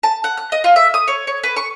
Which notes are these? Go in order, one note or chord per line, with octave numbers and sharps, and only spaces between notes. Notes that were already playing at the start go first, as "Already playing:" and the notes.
A5
F#5
F#6
D#5
F4
E5
D#6
C#5
C#5
B4
C#6